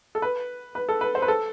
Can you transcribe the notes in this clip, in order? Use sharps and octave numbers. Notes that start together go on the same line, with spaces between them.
A4
B4
B4
A4
B4
C5
B4
A4